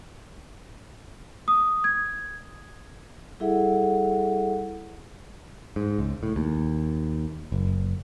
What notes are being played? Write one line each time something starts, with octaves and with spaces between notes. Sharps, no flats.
D#6
G#6
G3 E4 G#4 A4 E5 F#5
G#2
C#2
A2
D#2
F#1